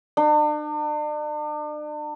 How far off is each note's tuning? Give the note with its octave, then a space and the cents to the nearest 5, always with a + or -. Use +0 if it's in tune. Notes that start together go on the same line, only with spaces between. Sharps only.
D4 +40